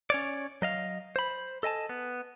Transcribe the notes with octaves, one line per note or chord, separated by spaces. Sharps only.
C#4 C#5 D5
F#3 D#5 F5
C5 B5
A4 D#5 G#5 A5
B3